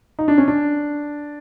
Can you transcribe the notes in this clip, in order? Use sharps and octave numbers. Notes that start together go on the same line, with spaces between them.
D#4
D4
C#4
D4